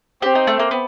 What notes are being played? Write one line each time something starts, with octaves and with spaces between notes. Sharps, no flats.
C4 G4
D#4
A3
A#3
B3